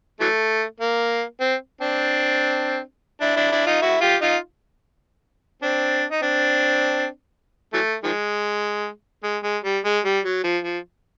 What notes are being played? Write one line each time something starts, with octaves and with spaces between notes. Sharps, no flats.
E3 F#3 A3
A#3
C4
C4 D4
D4 E4
D4 E4
D4 E4
D#4 F4
E4 F#4
F4 G4
D#4 F4
C4 D4
D#4
C4 D4
E3 F#3 A3
D#3 F3 G#3
G#3
G#3
G3
G#3
G3
F#3
F3
F3